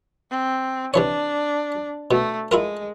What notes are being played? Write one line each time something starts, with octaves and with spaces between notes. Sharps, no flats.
C4
C3 E3 D4 C#5
B2 A3
G#3 E4 F4 A#4